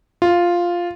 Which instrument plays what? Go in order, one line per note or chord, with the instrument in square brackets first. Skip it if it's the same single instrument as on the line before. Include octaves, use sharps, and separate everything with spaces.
[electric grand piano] F4